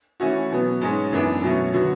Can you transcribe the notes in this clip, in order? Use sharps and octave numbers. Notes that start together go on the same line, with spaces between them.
E3 A3 C#4 F#4
B2 F#3 B3
G#2 G#3 C#4
F#2 E3 B3 D4
B2 F#3 A3 C#4
D3 F#3 B3 F#4